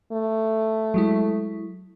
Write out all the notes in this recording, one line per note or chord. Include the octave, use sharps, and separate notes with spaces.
A3
F#3 G#3 E4